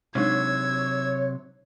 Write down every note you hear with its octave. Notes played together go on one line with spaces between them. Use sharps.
C3 F#3 G#3 D4 D#4 C#5 E6 G#6